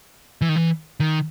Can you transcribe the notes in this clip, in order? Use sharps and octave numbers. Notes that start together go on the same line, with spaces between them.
E3
D#3
E3
D#3